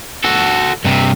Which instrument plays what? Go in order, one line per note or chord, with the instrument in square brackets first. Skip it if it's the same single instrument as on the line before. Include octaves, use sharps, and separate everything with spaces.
[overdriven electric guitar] F#4 A4
G2 C3